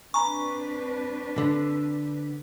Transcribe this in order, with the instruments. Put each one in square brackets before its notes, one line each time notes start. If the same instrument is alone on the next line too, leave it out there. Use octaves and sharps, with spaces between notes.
[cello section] C4 D4 B4 [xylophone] G#5 A#5 B5 [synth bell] C#6
[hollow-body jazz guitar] D3